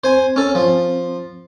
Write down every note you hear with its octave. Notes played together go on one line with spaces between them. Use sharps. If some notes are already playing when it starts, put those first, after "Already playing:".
C4 C5 G#5
C#4 A4
F3